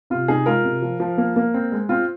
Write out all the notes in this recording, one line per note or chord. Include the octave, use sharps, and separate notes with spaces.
C3 F4
C3 D#4 G#4
G#3 F4 A#4
C3
F3
F3
A#3
A#3
C4
G#3
C4 F4